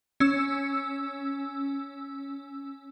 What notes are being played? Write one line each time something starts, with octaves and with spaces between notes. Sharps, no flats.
C#4 E6